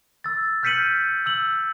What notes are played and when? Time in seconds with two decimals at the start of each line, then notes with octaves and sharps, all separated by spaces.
0.24 E6 A6
0.63 F6 G6 B6 C#7 D#7 F#7
1.26 E6 F#7